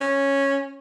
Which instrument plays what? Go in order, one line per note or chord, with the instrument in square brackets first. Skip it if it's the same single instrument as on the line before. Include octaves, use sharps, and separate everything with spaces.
[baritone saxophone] C#4